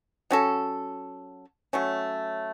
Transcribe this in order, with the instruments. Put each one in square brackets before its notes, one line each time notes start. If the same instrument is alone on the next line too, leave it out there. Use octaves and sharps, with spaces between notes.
[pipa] F#3 C#4 F#4 A4
F#3 A3 C#4